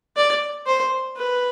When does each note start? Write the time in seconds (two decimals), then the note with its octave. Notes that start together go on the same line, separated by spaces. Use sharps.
0.16 D5
0.66 C5
1.17 B4